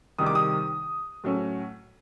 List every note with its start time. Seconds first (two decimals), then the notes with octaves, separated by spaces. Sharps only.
0.18 C2 C3 D#3 D#6
0.26 D6
0.35 D#6
1.24 A2 F#3 A3 C#4